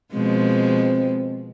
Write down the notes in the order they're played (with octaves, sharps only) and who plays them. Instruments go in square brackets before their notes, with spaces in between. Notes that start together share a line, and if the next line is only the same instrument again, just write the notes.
[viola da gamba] B2 F3 G#3 [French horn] C4